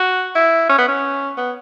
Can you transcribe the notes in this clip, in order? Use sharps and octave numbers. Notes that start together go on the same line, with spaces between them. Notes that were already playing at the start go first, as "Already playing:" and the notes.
Already playing: F#4
E4
C#4
B3
C#4
B3